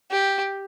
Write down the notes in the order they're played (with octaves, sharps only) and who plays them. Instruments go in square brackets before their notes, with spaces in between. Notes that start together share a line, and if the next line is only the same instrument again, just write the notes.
[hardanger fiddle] G4